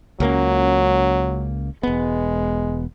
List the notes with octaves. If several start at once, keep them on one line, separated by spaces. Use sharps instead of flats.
C#2 F#3 A#3 C#4
E1 G#3 B3